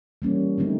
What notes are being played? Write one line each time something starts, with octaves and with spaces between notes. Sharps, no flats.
E3 G3 A#3 C#4
D3 F#3 A3 C4 D#4